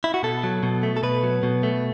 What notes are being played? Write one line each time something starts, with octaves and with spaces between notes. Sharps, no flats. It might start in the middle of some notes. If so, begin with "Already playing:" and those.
E4
F#4
B2 A4
F#3
B2
A3
A4
B2 B4
F#3
B2
A3